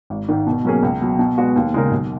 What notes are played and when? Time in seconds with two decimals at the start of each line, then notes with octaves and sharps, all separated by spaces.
0.10 G#1
0.28 G#2 D#3
0.47 B2
0.65 F#3 A#3 C#4 G#4
0.82 C#2
1.01 B2 F#3
1.19 B2
1.38 G#3 B3 F#4
1.56 D#2
1.74 C#3 G#3 D#4 A#4
1.91 B1